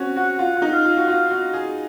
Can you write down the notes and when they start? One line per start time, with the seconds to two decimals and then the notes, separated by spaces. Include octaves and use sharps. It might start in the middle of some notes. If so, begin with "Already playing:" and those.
Already playing: C4 C#4 F#4
0.16 F#4 F#5
0.39 F4 F#5
0.57 F4
0.62 D#4
0.73 F5
0.85 F4
0.97 F#4
1.08 F4
1.30 F#4
1.53 G#4